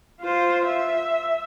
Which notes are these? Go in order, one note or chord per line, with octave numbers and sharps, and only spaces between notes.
F4 C5
E5